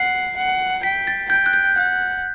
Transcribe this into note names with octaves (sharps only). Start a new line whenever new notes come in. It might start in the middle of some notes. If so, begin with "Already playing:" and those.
Already playing: F#5 C7
F#5
G5 B6
A6
G5 G6
F#6
G6
F#5 F#6